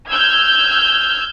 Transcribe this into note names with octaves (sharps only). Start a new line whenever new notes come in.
E6 F6 G6 G#6